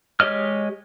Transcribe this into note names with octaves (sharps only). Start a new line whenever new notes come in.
G#3 G4 C#5 D#5 F6